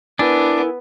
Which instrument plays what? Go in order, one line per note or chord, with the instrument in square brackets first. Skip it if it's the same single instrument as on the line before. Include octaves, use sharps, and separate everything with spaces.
[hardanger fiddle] B3 [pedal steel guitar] D4 [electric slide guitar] E4 A#4 G#5